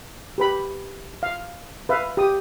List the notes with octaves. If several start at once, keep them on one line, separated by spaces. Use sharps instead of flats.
G4 B4 B5
F5
B4 E5 F5
G4 D#6